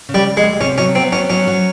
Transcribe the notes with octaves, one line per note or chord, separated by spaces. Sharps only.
C#3
G3
D2
G#3
D2
C3 C#4
F#3 C#4
B3 C4
B3 C#4
F#3 C#4
F#3